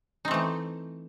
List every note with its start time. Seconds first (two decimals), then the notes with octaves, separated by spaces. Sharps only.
0.25 D#4
0.28 C4
0.31 A3
0.34 E3